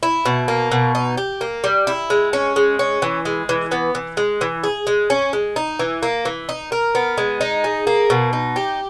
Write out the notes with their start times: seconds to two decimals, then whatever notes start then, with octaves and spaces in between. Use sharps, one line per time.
0.03 E4
0.25 B2
0.48 A#3
0.71 B2
0.95 D#4
1.17 G4
1.41 A#3
1.64 G3
1.87 E4
2.10 G#3
2.33 C#4
2.56 G#3
2.79 C#4
3.02 E3
3.25 G#3
3.49 E3
3.71 B3
3.95 E3
4.17 G#3
4.41 E3
4.64 G#4
4.87 G#3
5.10 C#4
5.33 G#3
5.56 D#4
5.79 E3
6.03 A#3
6.25 E3
6.49 D#4
6.72 A#4
6.95 B3
7.18 G#3
7.41 D#4
7.64 G#4
7.87 A#3
8.10 B2
8.33 D#4
8.56 G4